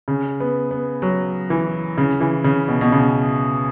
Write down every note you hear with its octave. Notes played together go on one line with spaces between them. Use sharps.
C#3
B3
B3
F#3
E3
C#3
E3
C#3
B2
B2
C#3